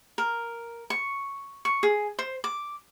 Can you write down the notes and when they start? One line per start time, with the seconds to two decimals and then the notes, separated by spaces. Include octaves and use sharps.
0.18 A#4
0.90 C#6
1.65 C#6
1.83 G#4
2.19 C5
2.44 D6